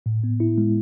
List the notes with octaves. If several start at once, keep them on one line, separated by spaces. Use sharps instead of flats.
A2
B3
E4
G#3